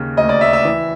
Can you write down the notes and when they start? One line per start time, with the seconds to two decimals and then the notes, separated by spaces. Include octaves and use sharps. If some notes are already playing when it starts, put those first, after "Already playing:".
Already playing: D#2 C#3
0.17 D2 D#5
0.29 D5
0.41 D2 E5
0.53 E5
0.65 E3